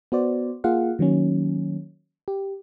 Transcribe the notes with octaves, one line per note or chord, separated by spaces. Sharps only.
B3 F#4 C5 D5
A#3 F4 G#4 F5 F#5
D#3 F#3 A#3 C#4
G4